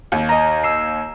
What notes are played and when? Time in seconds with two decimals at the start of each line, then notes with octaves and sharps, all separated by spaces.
0.12 D#2
0.29 D#5 A#5
0.63 E6 C7